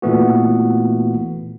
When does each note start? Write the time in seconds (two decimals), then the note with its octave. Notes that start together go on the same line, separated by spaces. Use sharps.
0.02 A#2 E3 A3 B3 F#4